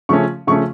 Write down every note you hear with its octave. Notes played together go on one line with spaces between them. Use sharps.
C#3 F3 A3 C#4 C#6
C#3 F3 A3 C#4 C#6